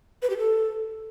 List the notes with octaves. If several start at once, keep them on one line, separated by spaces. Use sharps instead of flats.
B4
G4
A4